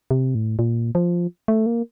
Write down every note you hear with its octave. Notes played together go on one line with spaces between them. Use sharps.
C3
A2
A#2
F3
A3
A#3